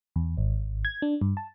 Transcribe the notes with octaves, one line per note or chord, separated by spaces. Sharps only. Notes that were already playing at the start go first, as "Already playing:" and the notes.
E2
G#1
G#6
D4
G2
A5